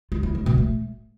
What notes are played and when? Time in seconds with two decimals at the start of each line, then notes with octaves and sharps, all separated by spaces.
0.12 F4
0.23 E4
0.35 A3
0.46 B2
0.58 A3